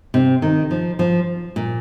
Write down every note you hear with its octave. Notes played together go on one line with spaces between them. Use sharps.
C3
D#3
F3
F3
A#2